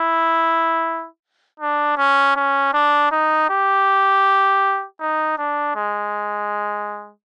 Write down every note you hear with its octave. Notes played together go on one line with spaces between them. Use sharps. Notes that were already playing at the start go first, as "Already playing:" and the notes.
Already playing: E4
D4
C#4
C#4
D4
D#4
G4
D#4
D4
G#3